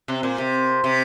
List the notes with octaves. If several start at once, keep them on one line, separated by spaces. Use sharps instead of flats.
C3
A#2
C3
C3